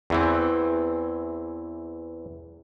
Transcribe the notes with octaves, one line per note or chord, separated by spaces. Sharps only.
E2 E3 C4